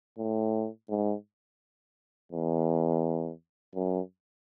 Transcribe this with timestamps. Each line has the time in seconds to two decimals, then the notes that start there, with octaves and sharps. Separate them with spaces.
0.18 A2
0.89 G#2
2.32 E2
3.75 F#2